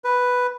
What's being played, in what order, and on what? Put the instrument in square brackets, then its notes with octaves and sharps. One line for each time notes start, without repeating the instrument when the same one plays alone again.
[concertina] B4